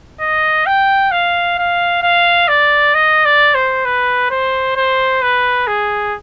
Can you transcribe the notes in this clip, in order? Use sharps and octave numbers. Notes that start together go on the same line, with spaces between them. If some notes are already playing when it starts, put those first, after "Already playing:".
D#5
G5
F5
F5
F5
D5
D#5
D5
C5
B4
C5
C5
B4
G#4